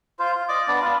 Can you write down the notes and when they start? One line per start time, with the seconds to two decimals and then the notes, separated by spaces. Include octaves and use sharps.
0.19 F4 C5
0.35 F4
0.49 D5 D#5 D6
0.68 B3 D4 D5
0.82 F4 B4